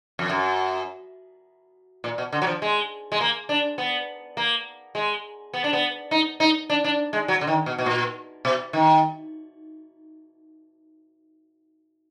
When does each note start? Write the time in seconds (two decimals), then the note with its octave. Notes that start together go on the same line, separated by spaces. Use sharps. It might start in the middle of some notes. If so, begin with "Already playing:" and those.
0.19 F2
0.29 F#2
2.04 A#2
2.18 B2
2.33 D3
2.42 F#3
2.47 F3
2.62 G#3
3.12 G#3
3.21 A#3
3.49 D4
3.78 B3
4.37 A#3
4.95 G#3
5.54 B3
5.64 D4
5.73 B3
6.11 D#4
6.40 D#4
6.70 D4
6.84 D4
7.13 G#3
7.28 F#3
7.41 D3
7.47 D#3
7.66 B2
7.78 B2
7.86 A#2
8.45 B2
8.73 D#3